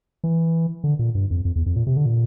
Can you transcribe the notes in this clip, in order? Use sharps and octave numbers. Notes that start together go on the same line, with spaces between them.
E3
D3
A#2
G2
F2
F2
E2
F2
A#2
C3
D3
A#2